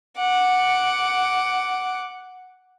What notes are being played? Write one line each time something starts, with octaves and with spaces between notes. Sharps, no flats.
F#5 D6